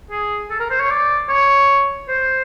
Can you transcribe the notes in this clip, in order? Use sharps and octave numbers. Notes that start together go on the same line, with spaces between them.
G#4
A4
A#4
C5
C#5
D5
C#5
C5